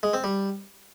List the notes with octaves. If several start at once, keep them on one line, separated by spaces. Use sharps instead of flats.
G#3
C4
G3